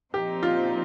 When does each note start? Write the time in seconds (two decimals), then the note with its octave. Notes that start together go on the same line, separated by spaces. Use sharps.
0.13 A#2 F3 C4 D#4 G4
0.43 F4